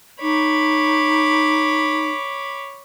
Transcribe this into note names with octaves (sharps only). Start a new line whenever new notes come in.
D#4 C#5 B5 D6